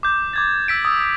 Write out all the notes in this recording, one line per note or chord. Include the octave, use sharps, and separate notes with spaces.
D6 G6
D6 G#6 A6
E6 B6 D7
D#6 E6